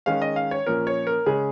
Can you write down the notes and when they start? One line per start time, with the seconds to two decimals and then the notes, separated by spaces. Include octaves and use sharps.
0.06 D#3 G#3 C#4 F5
0.22 D#5
0.36 F5
0.51 C#5
0.67 A#2 F3 A#3 C#4 A#4
0.87 C#5
1.07 A#4
1.26 C#3 G#3 C#4 G#4